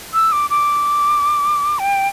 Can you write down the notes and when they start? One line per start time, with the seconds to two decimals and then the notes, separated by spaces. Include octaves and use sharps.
0.14 E6
0.32 D6
0.50 D6
1.79 G5